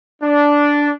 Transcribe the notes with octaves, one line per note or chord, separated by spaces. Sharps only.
D4